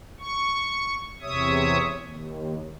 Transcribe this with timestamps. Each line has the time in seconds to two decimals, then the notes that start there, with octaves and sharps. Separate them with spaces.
0.19 C#6
1.21 E2 C3 C#5 E5 D#6
2.05 D#2